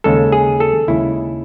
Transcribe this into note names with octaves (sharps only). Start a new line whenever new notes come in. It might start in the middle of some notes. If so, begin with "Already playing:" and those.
D#2 C#3 G#3 A4
G#4
A4
D#2 C#3 G#3 E4